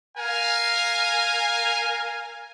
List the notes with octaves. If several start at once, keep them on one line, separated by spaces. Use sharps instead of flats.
A#4 F5 G#5